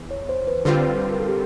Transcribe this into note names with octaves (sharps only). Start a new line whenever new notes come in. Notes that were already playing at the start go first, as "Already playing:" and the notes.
Already playing: E2
C#5
C5
B4
D3 G3 C4 F4 C5
B4
A#4
A4
G4